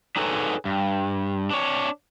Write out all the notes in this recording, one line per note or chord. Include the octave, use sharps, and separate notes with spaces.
D4 D#4 G#4 A4 B4 C#5
G2
D4 C#5